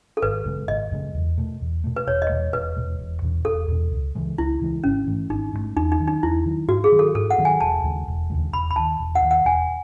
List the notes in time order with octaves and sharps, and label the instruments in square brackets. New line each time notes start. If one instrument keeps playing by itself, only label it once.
[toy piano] A4
[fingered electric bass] G#1 [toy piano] B4
[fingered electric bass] F#2 C#3 G#3
[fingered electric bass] G#1 [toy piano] D#5
[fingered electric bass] F#2 C#3 G#3
E2
B2 A3
E2
B2 A3
[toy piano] B4
[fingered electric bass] E1 [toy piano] C#5
[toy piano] D#5
[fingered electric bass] E2 B2 G#3
[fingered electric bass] E1 [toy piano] B4
[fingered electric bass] E2 B2 G#3
E1
E2 B2
[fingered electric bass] E1 [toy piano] A4
[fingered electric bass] E2 B2
C#2
C#3 E3 G#3
[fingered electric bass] C#2 [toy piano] E4
[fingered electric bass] C#3 E3 G#3
[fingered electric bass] G#1 [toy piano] C#4
[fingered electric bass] G#2 E3 A3
[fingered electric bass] G#1 [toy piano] D#4
[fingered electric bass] G#2 E3 A3
[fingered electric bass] E2 [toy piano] D#4
[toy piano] D#4
[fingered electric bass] D#3 F#3
[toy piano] D#4
[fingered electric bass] E2 [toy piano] E4
[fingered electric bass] D#3 F#3
[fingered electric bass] G#2 [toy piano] F#4
[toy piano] G#4
[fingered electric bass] D#3 F#3 B3
[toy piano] A4
[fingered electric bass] G#2 [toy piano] A4
[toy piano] F#5
[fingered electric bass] D#3 F#3 B3
[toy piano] G#5
[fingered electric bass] E1 [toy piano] A5
[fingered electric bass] D#2 C#3 G#3
E1
D#2 C#3 G#3
[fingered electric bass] E1 [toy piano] B5
[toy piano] B5
[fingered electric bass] D#2 D#3 [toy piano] A5
[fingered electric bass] E1
[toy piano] F#5
[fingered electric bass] D#2 D#3
[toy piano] F#5
[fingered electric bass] E1 [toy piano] G#5